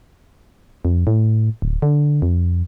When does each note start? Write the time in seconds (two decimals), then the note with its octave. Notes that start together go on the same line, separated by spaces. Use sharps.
0.85 F2
1.07 A2
1.62 D1
1.82 D3
2.22 F2